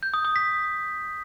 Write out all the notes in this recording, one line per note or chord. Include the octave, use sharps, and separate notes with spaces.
G6
D#6
D#6
B6